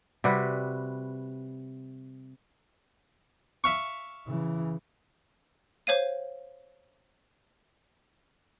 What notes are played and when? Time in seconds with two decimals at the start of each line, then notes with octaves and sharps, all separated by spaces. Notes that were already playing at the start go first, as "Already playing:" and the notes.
0.24 C3 G3 F#4 B4
3.64 E5 F5 C#6
4.27 C#3 E3
5.87 C5 C#5 F5 D#7